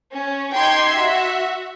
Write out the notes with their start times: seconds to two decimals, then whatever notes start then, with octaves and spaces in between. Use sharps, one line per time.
0.13 C#4
0.56 D#4 G4 G5 C6 G#6 C7
0.93 F#4 E5